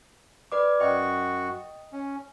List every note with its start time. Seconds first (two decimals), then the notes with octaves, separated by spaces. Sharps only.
0.52 B4 D5 D6
0.80 F#2 F#4 D#5 G5 C#6
1.92 C#4